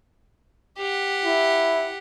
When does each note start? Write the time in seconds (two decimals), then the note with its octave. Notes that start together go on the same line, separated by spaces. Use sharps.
0.78 G4 F#5
1.25 E4